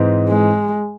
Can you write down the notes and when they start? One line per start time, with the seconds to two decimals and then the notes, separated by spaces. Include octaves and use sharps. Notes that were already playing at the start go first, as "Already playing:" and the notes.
Already playing: G#2 E3 C4 D#4
0.28 G#3